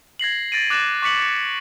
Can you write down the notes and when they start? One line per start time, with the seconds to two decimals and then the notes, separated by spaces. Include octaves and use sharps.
0.19 G#6 A#6 C7 F#7
0.52 A6 A#6 D7 D#7
0.70 D6 F#6 A6 A#6 E7
1.02 C#6 D6 B6 C#7 F#7
1.22 C#7